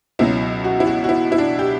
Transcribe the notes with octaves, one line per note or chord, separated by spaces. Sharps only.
C#2 B2 F#3 E4
F#4
E4
F#4
F#4
E4
E4
D4
G4